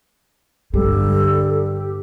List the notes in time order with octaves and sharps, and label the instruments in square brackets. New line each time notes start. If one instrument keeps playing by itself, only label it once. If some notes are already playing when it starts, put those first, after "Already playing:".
[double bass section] G2 D3 [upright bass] G3 [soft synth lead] G4 [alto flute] A4